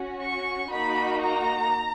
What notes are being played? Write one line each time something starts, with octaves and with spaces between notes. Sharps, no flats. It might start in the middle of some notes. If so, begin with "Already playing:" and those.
Already playing: C#4 F#4
C#6
A#3 D#4 F#4 B5
A#5